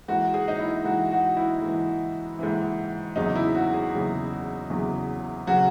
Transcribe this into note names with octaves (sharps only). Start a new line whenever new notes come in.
G#2 E3 F#4
G#4
D#4
E4
G#2 E3 F#4
F#4
E4
G#2
E3
G#2 E3
E2 C#3 F#3 D#4
E4
F#4
G#4
E2 C#3 F#3
E2 C#3 F#3
C#3 F#3 F#4